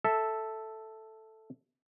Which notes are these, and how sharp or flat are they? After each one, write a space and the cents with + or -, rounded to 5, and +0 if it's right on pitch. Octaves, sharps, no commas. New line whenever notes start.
A4 +0 E5 -10